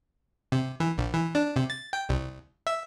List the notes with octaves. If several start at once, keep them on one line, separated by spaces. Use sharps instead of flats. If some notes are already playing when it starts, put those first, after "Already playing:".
C3
E3
A#1
E3
D4
C3
A6
G5
C2
E5